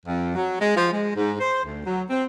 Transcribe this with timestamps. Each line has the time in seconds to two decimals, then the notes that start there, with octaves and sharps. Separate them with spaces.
0.06 F2
0.35 F#3
0.60 G#3
0.76 F3
0.92 G#3
1.15 G#2
1.40 C5
1.64 D2
1.85 F#3
2.10 C4